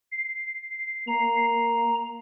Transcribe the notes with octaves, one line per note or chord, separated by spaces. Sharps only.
C7
A#3 A#5